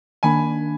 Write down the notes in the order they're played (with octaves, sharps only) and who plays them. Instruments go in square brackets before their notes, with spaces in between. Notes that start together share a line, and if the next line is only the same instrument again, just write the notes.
[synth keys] D#3 A#3 D4 [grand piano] G#5 B5